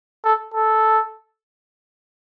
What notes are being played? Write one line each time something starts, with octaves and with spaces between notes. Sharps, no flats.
A4
A4